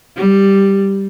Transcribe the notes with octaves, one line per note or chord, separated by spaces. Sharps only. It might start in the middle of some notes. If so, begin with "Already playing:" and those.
G3